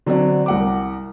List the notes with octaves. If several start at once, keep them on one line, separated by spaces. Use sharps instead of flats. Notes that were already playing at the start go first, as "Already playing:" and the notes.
D3 F#3 C4 D4 D5
C2 F#5 D6